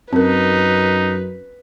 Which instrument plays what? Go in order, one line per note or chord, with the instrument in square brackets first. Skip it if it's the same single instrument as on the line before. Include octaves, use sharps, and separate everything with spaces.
[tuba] F#2 [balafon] C4 A#4 [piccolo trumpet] D#4 [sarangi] B4